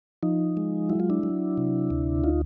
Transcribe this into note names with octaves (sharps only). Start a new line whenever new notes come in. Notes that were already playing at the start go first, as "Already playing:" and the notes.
F3 D#4
G#3
F#3 E4
F4
D4 E4
F#3
C3
D2
D#4 F4